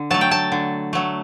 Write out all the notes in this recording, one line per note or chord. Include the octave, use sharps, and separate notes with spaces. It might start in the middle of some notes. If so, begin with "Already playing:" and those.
Already playing: D3
F#3 A3 A5
G5
A5
D3
F#3 A3